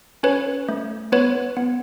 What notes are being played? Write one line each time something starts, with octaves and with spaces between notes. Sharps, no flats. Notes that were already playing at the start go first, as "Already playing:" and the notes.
C#4 B4 C#5
A3
B3 B4 C#5
B3